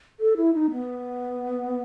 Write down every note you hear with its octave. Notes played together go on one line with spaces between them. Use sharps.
A4
E4
D#4
B3